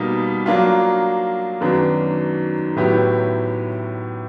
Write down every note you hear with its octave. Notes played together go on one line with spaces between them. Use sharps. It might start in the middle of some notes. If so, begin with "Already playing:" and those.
Already playing: B2 G3 A#3 D#4
F#3 A#3 D4 F4
F#2 D#3 F#3 B3 D4
A2 F#3 B3 E4 G4